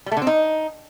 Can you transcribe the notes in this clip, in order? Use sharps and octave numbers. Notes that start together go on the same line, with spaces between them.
G3
A3
D3
C4
D#4